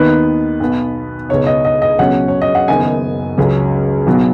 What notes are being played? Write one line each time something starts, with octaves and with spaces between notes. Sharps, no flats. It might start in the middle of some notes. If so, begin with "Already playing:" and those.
Already playing: D#2 D#3 B3 D#4 B4
B1 B2 B3
C#2 B2 B3 D#4 C#5
D#5
D#5
D#5
C#2 B2 F#3 C#4 F#5
C#5
D#5
F#5
F#1 F#2 D#3 B3 D#4 G#5
C#2 C#3 F#3 C#4
B1 B2 F#3 B3